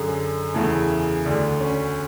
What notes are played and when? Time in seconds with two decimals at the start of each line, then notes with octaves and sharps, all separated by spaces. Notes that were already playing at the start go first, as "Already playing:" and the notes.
Already playing: F#2 D3 G#4
0.54 E2 C#3 E3 A4
1.25 D2 D3 D4
1.60 C#4